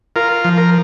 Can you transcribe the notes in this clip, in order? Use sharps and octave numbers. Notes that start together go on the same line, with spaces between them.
F4 A#4
F3
A#4